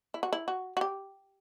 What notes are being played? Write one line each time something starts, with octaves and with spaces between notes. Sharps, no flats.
E4
F#4
E4
F#4
F#4
G4